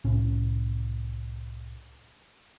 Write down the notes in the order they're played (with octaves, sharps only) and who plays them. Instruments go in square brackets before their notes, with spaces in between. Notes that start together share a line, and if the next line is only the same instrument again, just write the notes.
[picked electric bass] C2 A2 C#4